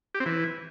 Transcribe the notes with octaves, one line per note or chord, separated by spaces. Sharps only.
G4
C4
E3